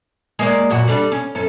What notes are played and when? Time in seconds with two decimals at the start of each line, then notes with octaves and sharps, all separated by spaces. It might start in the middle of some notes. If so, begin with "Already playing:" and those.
0.39 G#3 A#3 D5
0.70 F#2 A#2 F#4
0.88 G3 D4 A4
1.12 C#4
1.35 F#2 C#4 A4